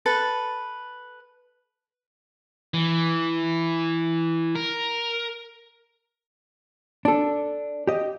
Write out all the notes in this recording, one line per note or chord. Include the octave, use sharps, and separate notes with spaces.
A4 B4 A5
E3
A#4
D4 A4
G4 D#5